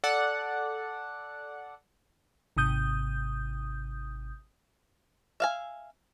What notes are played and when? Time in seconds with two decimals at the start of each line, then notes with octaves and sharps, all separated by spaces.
0.04 A4 D5 F#5
2.57 G#1 C3 D#6 G6
5.40 E5 F5 G#5